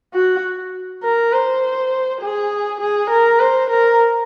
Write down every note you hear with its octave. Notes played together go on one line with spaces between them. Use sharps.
F#4
A#4
C5
G#4
G#4
A#4
C5
A#4